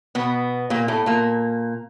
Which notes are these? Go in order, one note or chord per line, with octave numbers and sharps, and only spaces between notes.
B2 B3
A#2 A#3
A2 A3
A#2 A#3